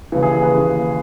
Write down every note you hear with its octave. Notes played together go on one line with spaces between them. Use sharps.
D#2 C#3 E3
G#4
G#4
B4
D#2 C#3 E3